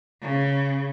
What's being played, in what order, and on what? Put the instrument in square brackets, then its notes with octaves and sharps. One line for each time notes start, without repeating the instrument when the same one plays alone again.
[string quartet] C#3